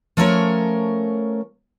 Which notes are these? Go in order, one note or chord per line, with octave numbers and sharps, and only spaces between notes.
F3 A3 C#4 A#4 C#5